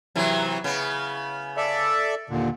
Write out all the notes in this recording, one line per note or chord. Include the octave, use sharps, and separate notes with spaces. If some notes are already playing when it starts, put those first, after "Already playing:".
C3 E3 F#3
C#3 B3
A4 D5 E5
D#2 A#2 D3